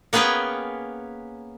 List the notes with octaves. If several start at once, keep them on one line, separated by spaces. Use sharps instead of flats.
A#3 B3 C#4 G#4 B4 G5